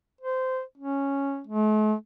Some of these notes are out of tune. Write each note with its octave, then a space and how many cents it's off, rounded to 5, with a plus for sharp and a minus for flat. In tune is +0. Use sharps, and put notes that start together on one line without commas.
C5 -15
C#4 -5
A3 -45